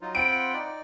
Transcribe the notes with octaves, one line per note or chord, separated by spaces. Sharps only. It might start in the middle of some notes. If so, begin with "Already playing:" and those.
F#3 D#4 F4
C4 F4 F#5 G5 B5 D7
D#4 D5